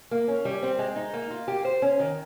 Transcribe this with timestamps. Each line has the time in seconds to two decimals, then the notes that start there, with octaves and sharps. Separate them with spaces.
0.11 A#3
0.28 C#4
0.45 G3
0.62 C4
0.79 G#3
0.96 D#4
1.13 A#3
1.30 F4
1.48 G4
1.65 C5
1.82 C#4
1.99 D#3